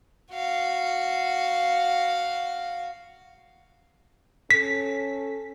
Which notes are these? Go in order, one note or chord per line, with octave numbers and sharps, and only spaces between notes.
F#4 F5
C#4 A4 B6